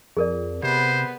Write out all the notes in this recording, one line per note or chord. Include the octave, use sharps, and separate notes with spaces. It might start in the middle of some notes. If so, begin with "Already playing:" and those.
F2 G#4 A#4 D5
C3 B3 C5